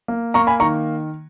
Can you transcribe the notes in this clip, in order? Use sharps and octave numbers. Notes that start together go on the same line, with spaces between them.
A#3
A#3 A#5 C#6
G#5 B5
D#3 A#5 C#6